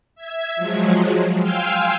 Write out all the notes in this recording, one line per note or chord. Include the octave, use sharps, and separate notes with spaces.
E5 G#6
F3 F#3 G#3
F5 G5 G#5 C6 E6 F6